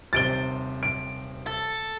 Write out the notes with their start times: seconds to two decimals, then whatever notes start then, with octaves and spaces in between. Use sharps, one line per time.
0.13 D#1 C3 C5 A6 D7 G7
0.83 D7
1.47 A4